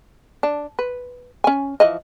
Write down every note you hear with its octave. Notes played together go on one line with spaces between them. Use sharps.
D4
B4
C#4 G#5
E3 F3 D#5